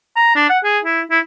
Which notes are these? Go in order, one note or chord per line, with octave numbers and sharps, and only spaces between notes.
A#5
D4
F#5
G#4
E4
E4